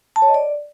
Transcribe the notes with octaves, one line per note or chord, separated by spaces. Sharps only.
A5
C#5
D#5
D5